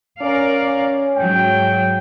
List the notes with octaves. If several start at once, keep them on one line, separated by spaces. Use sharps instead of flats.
C#4 A#4 D5 F5
G#2 F#3 G5